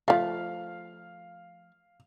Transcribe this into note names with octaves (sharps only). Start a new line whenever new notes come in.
F3 A3 F5